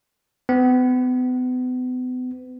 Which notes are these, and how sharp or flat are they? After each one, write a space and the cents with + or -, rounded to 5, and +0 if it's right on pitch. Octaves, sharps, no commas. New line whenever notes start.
B3 +35